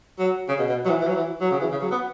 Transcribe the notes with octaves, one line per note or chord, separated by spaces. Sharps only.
F#3
C#3
B2
B2
F#3
E3
E3
F#3
E3
F#3
C#3
E3
C#3
F#3
B3